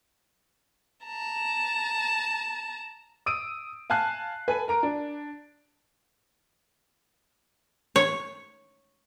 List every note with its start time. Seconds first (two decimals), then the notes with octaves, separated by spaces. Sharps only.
1.05 A5 A#5
3.26 D#6 E6 D7 D#7
3.90 F5 G#5 A5 F#6 C7
4.48 A4 B4 G#5
4.68 A#4 A#5 D7
4.83 D4
7.96 C#5